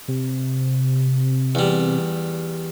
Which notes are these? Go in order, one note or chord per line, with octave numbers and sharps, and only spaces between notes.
C3
E2 G3